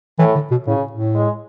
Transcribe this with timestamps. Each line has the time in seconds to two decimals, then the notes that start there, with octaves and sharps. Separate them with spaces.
0.19 A2 E3
0.35 D3
0.51 B2
0.67 A2 C#3
0.91 A2
1.15 G#3